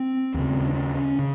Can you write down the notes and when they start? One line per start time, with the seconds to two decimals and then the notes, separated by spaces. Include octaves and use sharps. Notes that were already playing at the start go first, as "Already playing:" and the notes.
Already playing: C4
0.34 D#2
0.39 C#3
0.67 D4
0.74 C#4
0.95 C#4
1.19 C#3